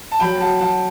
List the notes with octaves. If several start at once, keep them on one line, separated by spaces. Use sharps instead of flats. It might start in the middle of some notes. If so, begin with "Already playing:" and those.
A5
F#3 G5 B5
F#3 F#5 A5
F#3 F#5 A5